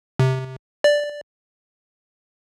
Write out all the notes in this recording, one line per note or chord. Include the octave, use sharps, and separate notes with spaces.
C3
D5